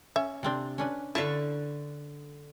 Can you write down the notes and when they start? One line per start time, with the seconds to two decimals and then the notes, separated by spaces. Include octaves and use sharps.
0.16 C#4 E5
0.43 C3 C4 D4
0.78 C#4 D4 B4
1.15 D3 E4 B4 E5 F5 A5 C#6